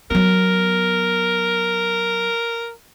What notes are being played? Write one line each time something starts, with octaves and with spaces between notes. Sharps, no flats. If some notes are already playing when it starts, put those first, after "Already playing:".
F#3 B3 A#4